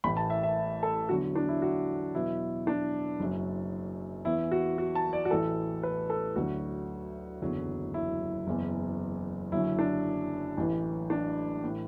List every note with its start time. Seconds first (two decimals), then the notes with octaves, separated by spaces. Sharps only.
0.04 A1 A2 E3 B5
0.17 A5
0.30 E5
0.43 E5
0.83 A4
1.09 E2 D3 F#3 F#4
1.35 D4
1.49 E4
1.62 F#4
2.15 E2 B2 F#3 E4
2.67 D4
3.20 F#1 F#2 F#3
4.25 E2 E3 E4
4.52 F#4
4.78 F#4
4.95 A5
5.13 D5
5.25 F#4
5.30 A1 A2 E3 A4
5.83 B4
6.10 A4
6.36 D2 D3 F#3 F#4
7.41 F#1 E2 D3 F#3
7.94 E4
8.47 F#1 E2 E3
9.52 F#1 F#2 D3 F#3 E4
9.79 D4
10.57 A1 A2 E3
11.10 D4
11.64 A2 E3